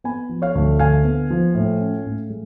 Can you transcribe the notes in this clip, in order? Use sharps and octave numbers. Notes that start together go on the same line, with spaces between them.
B3 G#5 B5
F3
C#5 F5
D2
D3 F5 G#5
B3
F3
A2
C#4
A2
G#3